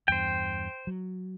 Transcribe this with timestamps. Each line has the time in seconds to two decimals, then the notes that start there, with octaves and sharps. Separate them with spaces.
0.08 E2 G2 C5 G5
0.87 F#3